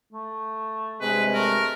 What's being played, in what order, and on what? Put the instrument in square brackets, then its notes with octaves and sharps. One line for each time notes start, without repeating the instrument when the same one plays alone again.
[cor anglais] A3
[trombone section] G2 C3 G#3 [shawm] B4
[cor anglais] A3 [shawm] A#4